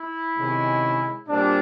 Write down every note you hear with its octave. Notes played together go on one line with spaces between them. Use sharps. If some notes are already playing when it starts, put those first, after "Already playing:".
Already playing: E4
C3 D#3 G#3 C#4
A#2 G3 C4 D4